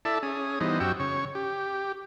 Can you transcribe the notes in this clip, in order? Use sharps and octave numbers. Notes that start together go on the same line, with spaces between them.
E4 A4 D5 E5 A5
C#4 G#4 D#6
E3 G3 B3 D#4 C5 D#5
F#2 F#4 G4 G5 C#6 E6
C#3 C#5 C#6
G4